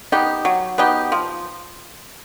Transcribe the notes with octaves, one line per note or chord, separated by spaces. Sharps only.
B3 D#4 G4
F#3
B3 D#4 G4
F3